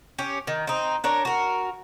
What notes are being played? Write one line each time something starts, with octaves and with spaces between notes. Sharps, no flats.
C#4 G4
D#3
C4 D#4
D4 A#4 C#5
F#4 A#4